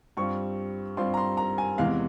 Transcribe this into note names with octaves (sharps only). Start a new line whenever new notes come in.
G2 G3 C4 F4 C#6
G2 G3 C4 F4 C6
A#5
C6
A#5
G#5
E2 C3 E3 G#3 F5